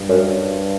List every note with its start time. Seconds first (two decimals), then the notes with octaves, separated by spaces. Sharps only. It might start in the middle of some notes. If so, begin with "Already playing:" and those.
Already playing: G2
0.09 F#2